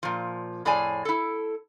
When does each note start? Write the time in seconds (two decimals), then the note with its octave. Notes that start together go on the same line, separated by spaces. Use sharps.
0.03 A#2 F3
0.65 F2 A2 G#4 C#5 D5 G#5
1.05 E4 A4